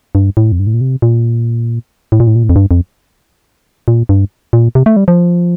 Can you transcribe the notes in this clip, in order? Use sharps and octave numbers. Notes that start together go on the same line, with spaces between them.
G2
A2
F2
G2
A2
A#2
C3
A#2
A2
A#2
A2
A#2
A2
F2
G2
F2
A#2
G2
A#2
C3
A3
G3
F3